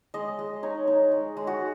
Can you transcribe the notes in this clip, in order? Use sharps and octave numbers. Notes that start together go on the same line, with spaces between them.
G#3 D#5
G#3
D#4 C#5
D#4
G#3
G#3
F#4